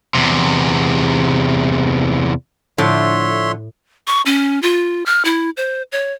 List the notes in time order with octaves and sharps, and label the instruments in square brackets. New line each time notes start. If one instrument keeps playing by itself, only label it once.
[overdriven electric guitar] E2 C3
[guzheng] A2 [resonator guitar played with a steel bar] D3 F3 [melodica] C#5 E5 C6
[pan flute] C#6
C#4
F4
F6
E4
C5
C#5